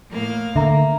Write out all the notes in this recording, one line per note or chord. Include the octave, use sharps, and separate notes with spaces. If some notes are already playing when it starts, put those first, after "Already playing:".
A2 A#3 F5
D3 A#3 E5 A#5